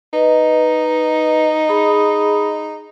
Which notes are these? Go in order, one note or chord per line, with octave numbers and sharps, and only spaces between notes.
D#4 B4 D#5
G#4 B5 D#6